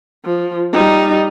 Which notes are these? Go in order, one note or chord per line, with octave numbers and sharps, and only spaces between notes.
F3
G3 D#4